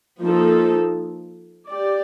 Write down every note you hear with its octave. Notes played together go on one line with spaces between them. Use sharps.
F3 A#3 D#4 A4
G4 D5